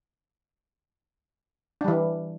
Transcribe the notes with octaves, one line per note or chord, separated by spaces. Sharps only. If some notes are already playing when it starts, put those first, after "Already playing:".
E3 G3 D4